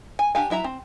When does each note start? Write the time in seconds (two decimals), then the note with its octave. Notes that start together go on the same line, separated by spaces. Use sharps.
0.19 G#5
0.35 D4 G4 F5 G#5
0.50 F#3 E4 E5 A#5
0.64 C4